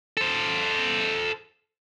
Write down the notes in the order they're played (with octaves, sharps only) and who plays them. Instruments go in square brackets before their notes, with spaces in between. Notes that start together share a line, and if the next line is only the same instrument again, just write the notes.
[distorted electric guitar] A4 C5